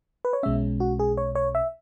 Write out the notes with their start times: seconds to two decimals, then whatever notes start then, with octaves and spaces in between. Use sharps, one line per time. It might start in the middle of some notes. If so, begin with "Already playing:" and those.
0.25 B4
0.33 C#5
0.43 B1 B2 G#3 C#4 E5
0.80 F#4
0.99 G#4
1.17 C#5
1.35 C#5
1.55 E5